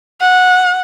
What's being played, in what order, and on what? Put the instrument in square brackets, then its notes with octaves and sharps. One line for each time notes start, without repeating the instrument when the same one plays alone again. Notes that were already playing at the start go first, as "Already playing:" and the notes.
[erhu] F#5